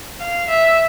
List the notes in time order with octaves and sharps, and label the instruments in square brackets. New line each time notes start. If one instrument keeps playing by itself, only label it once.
[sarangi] F5
E5